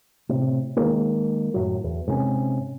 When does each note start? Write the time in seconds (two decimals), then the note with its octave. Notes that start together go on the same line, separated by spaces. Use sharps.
0.29 A2 C3
0.76 D#3 E3 G#3 A#3
1.54 F#2 A2 F#3
1.84 E2
2.07 G#2 C3 G#3 C#4